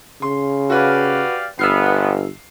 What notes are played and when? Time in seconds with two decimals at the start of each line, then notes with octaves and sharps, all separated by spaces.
0.22 C#3 C6
0.70 F#4 G4 B4 D5 F5
1.59 G1 B3 E6 F6 C7